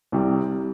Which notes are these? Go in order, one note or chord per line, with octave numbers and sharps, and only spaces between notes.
C2 C3 G3